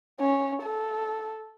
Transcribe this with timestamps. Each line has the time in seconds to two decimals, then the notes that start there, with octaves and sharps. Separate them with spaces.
0.20 C#4
0.62 A4